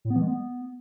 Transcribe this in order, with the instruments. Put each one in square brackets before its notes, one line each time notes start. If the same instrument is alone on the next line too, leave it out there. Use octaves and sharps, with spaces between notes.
[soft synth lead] A2
B3
E3
G#3
B3